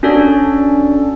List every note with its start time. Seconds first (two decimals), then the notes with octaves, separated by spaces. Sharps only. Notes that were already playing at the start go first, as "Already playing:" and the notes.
0.03 C#4 D4 F#4 A4 D5